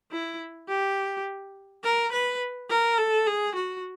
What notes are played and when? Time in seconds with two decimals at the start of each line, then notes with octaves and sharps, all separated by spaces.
0.12 E4
0.69 G4
1.84 A#4
2.12 B4
2.70 A#4
2.98 A4
3.27 G#4
3.55 F#4